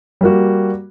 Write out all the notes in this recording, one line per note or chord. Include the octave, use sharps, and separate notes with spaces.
G3 A#3 F#4